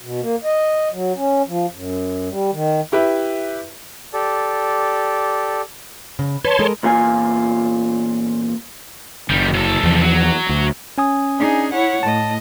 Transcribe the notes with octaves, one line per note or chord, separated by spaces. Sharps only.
B2
A#3
D#5
F#3
C#4
F3
F#2
G3
D#3
E4 G4 B4 E5
G4 A4 D5
C#3
B4 C#5 A5 C6
G#3 A4 A#4
E2 A#2 F4 G#5
F#1 D#3 G3
C2 A4
E2 F3
F#3
D2
C#4 G#5 D#6
D4 D#4 G#4
E4 C#5 F#5
A2 D#5 A5